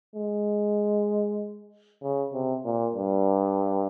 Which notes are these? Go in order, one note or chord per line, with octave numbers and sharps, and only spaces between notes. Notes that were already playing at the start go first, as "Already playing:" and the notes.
G#3
C#3
C3
A#2
G2